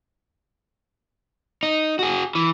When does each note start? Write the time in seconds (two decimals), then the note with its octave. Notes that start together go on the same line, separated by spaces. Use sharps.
1.63 D#4
1.99 F#4 G#4
2.35 E3